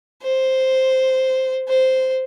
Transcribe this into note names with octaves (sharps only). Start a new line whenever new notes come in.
C5
C5